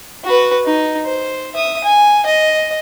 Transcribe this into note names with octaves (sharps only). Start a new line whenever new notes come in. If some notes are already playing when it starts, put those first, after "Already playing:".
F#4 B4
D#4
C5
E5 D#6
G#5
D#5